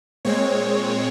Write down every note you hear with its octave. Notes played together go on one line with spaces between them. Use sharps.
A#2 G#3 C4 C#5